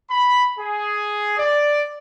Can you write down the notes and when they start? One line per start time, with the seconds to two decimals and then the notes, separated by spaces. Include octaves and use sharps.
0.10 B5
0.59 G#4
1.38 D5